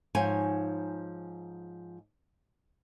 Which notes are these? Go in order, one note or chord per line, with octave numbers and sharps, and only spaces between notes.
G#2 F3 D#4 C#5 G#5